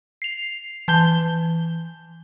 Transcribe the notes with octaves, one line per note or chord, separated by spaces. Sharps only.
C7 F7
E3 A5 G6 G7